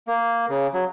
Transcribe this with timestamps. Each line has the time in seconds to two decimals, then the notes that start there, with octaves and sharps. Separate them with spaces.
0.08 A#3
0.49 C#3
0.74 F#3